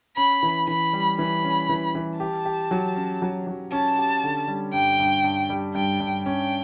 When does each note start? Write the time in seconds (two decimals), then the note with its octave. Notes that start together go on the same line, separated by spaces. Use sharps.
0.17 C#4 B5
0.43 E3
0.67 E3 B5
0.93 G3
1.18 E3 B5
1.44 C#4
1.69 E3
1.95 E3
2.19 G4 A5
2.45 G4
2.71 F#3
2.96 C#4
3.22 F#3
3.47 F#3
3.72 C#4 A5
3.98 G4
4.23 D3
4.48 G3
4.73 G2 G5
4.99 G2
5.24 G2
5.50 G3
5.75 G2 G5
6.00 G2
6.26 C#4 G5